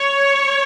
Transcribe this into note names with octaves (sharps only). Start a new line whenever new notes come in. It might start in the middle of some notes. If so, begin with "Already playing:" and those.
Already playing: C#5